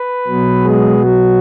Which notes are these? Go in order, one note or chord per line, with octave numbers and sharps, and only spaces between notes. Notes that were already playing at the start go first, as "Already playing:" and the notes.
Already playing: B4
B2 F#3 B3
G#3 G#4
F#3 F#4